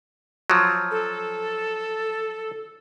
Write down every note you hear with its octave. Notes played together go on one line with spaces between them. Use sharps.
F3 F#3
A4